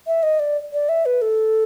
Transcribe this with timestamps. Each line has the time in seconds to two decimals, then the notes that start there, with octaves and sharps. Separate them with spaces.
0.07 E5
0.23 D#5
0.39 D5
0.73 D5
0.89 E5
1.06 B4
1.22 A4